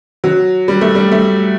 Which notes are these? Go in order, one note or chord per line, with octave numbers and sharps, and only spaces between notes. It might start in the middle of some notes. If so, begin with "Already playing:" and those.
F#3
G3
A3
G3
A3